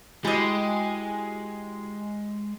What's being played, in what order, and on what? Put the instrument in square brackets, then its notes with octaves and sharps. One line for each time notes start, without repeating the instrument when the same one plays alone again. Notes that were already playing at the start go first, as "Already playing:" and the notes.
[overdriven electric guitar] G#3 [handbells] E4 F#4 G#5 [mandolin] G4 D#5